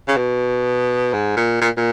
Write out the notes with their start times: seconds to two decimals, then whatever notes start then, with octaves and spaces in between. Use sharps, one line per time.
0.08 C#3
0.16 B2
1.13 G#2
1.37 A#2
1.61 A#2
1.77 A#2